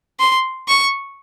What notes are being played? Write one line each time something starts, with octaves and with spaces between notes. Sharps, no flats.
C6
C#6